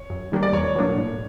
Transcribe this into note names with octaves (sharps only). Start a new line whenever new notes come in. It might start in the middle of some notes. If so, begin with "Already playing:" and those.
Already playing: C#5
F#2
D#3 G3 A#3 D4
D5
E2 C#5
B2 F#3 A#3 D4
A2